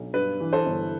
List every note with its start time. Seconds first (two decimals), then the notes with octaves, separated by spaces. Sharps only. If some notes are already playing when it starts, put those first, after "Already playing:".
Already playing: B1
0.13 G2 B4
0.40 E3
0.53 A4 C5
0.66 G1